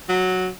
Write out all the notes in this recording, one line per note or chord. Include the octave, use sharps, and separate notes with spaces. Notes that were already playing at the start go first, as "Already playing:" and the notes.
F#3